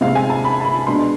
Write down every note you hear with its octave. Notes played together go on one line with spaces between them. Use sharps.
C3 G#3 C4 F5
G#5
A5
B5
A5
B5
B2 G#3 D4 C6